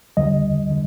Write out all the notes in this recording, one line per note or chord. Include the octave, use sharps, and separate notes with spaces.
D#2 D3 G3 D#5
D3